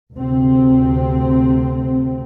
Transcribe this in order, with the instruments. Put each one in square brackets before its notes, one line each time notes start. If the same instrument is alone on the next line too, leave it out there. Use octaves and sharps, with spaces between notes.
[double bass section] D2 C3 C4